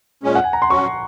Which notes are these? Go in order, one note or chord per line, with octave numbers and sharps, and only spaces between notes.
A#2 G#3 C#4
F#5
G#5
A#5
C6
F#3 C#4 F#4 C#6